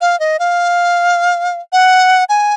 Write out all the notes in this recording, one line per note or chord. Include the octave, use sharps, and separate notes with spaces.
F5
D#5
F5
F#5
G#5